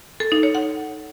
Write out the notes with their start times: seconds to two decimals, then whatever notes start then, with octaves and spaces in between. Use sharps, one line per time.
0.20 A4
0.32 D#4
0.43 C#5
0.55 F#5